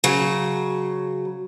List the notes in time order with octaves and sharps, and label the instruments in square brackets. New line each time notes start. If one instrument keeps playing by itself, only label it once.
[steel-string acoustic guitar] C#3 F#3